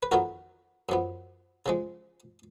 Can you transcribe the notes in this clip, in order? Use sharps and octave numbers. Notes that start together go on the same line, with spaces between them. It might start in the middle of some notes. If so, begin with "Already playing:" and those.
B4
F2 D#3 F#3 B3 F#4 A#4
F#2 F3 B3
C#3 F3 G#3